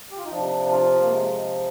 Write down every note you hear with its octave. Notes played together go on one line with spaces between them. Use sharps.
G4
F4
D#4
C3 F3 D4
F4
A#3
G#3